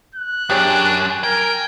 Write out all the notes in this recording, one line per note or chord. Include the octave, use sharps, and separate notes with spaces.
F#6
F#2 D4 G4 G#4 C#5
A#4 G5 G#5